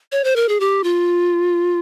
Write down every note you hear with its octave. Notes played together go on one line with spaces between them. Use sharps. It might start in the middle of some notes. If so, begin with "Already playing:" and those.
C#5
C5
A#4
G#4
G4
F4